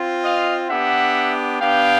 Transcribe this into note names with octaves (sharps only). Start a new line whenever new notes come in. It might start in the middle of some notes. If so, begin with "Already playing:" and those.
Already playing: C4 F4
D#5 F5
B3 D4 G4 E5 F#5
B3 D4 G4 F5 G5